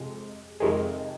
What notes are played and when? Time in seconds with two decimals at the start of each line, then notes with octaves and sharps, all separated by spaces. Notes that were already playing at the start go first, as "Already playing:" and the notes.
Already playing: F2 C3 G#3
0.60 F2 C3 D#3 G#3